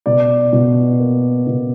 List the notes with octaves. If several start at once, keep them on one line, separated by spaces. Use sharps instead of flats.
B2 D5
B2
A#3
B2